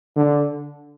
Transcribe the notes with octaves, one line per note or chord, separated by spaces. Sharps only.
D3